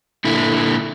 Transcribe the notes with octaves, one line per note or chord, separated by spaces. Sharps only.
A#2 D3 E4